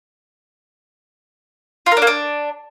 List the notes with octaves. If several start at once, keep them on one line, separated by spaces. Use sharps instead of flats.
F4
A#4
D4
A#3
D4